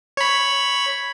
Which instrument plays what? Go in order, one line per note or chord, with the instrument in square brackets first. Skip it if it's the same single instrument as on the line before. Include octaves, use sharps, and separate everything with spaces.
[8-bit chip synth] C#5 B5